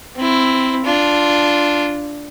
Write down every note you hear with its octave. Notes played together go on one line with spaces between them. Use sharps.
C4 E4
D4 F4